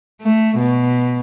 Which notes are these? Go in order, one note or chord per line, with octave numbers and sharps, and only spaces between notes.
A3
B2